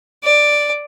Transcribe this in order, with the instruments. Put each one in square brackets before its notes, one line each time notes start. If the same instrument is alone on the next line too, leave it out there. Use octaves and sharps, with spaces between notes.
[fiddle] D5